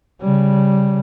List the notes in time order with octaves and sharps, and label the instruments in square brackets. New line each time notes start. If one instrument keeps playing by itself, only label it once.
[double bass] C#3 G3